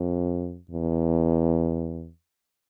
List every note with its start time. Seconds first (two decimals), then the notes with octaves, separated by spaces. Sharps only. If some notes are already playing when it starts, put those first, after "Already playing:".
Already playing: F2
0.71 E2